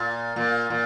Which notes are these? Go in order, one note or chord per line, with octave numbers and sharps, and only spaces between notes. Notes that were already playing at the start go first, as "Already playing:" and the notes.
Already playing: A#2
A#2
A#2